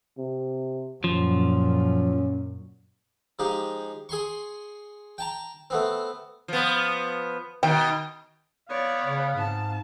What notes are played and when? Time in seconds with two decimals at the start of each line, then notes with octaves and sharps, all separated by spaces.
0.18 C3
1.04 F#2 A#2 F3 C#4
3.39 F3 G#3 D#4 G4
4.09 G#4 G#5 C6 C#6
5.18 G5 A5 A#5
5.70 A3 B3 C4
6.48 F3 B3
7.63 B2 D#3 G5
8.70 B3 C#5 D5 F5
9.04 C#3
9.36 G#2 C4 A5